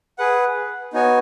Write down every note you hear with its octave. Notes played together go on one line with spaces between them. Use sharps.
G#4 B4 F#5
B3 D#4 F#4 C#5 G#5